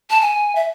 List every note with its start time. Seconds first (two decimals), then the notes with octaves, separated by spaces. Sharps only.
0.10 A5
0.21 G#5
0.55 E5